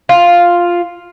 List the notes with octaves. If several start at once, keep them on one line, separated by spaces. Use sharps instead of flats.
F4